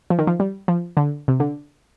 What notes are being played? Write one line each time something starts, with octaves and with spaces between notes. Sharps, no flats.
F3
D#3
F3
G3
F3
D3
C3
D3